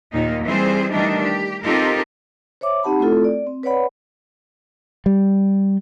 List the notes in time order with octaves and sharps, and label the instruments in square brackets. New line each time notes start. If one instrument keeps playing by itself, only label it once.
[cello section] D#2 A#2 A#3 D#4
E3 G3 C4 G#4 C5
D#3 E3 G3 A3 D4 D#4
G4
C4 D#4 F4 G4 A4 A#4
[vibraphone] C5 C#5 E5 D6
C4 D#4 G4 F#5 A5 B5
A3 C4 E4 F4 A4
D5
C4
B4 C#5 D5 F#5 B5
[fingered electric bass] G3